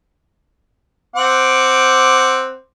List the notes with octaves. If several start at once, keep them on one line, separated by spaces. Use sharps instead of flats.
C4 F#5 D6